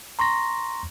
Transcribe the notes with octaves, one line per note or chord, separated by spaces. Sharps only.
A#5 C6 C#6 A#6